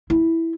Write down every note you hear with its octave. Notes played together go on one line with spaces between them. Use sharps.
E4